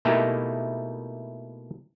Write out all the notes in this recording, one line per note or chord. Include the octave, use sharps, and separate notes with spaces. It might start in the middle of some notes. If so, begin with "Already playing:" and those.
B2 A3 A#3 D#4 E4 G4